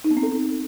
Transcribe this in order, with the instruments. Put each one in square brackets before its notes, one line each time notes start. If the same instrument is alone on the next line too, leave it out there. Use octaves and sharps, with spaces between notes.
[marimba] D#4
B3
C4
A4